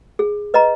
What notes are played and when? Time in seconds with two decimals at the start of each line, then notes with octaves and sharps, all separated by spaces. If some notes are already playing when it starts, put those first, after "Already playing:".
0.19 G#4
0.54 B4 D#5 A#5